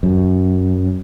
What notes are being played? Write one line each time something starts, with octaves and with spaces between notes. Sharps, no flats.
F#2